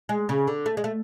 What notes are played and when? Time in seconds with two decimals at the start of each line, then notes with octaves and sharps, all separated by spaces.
0.09 G#3
0.29 C#3
0.48 D3
0.66 A3
0.77 G#3
0.84 A3